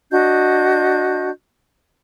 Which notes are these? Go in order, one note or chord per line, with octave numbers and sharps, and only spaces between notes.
D4 F#4 D#5 G6